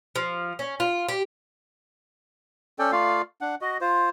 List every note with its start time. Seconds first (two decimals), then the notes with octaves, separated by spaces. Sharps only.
0.16 F3
0.59 C#4
0.80 F4
1.09 G4
2.79 C#4 A4 D5 G5
2.92 A3 F4 D5 F5
3.41 D4 F#5
3.61 F#4 D#5
3.81 F4 C5